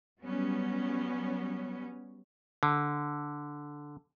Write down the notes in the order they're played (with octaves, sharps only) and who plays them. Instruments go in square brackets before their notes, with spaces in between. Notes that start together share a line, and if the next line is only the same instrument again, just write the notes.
[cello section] F#3 G3 B3 C#4
[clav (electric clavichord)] D3